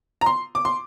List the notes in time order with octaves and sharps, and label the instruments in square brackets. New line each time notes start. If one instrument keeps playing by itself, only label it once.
[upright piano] A#5
C6
D6
C6